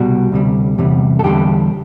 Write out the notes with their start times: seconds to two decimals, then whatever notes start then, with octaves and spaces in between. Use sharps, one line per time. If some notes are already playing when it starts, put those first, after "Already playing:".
Already playing: C2 B2 G3 F#4
0.32 D2 C3 G3
0.78 E2 C3 G3
1.19 A4
1.23 E2 D3 G3 G4